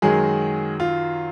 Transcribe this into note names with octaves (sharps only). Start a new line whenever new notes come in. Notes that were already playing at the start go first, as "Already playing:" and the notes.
F#2 D#3 F#3 G#3 G#4
F4